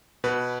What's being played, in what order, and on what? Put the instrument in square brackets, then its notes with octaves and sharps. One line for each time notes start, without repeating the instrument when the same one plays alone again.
[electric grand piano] B2 B4